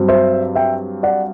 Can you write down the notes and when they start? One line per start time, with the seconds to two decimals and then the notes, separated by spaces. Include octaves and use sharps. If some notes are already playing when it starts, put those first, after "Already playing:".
Already playing: G2 F#3 C4
0.08 C5 E5
0.55 E5 G5
1.03 D5 F#5